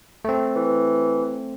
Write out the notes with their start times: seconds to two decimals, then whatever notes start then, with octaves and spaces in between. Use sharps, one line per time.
0.25 A3 C4
0.56 E3